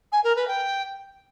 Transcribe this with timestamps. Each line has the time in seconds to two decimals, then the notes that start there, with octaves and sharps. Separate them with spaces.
0.12 G#5
0.24 A#4
0.36 B4
0.47 G5